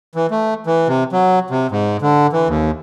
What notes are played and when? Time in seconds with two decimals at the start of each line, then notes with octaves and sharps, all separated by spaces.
0.16 E3
0.31 A3
0.67 E3
0.88 C3
1.13 F#3
1.50 C3
1.71 G#2
2.02 D3
2.33 E3
2.48 D#2